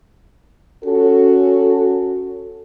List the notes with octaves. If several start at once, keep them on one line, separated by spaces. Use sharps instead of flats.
C#4 F#4 A4